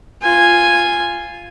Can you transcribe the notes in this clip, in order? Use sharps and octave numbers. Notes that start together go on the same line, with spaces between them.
F4 G#5